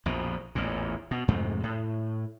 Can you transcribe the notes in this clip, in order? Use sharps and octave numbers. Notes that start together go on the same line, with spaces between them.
A#1 F2 B2
A1 E2 A#2
B2
F2 G#2 C3 A3
A2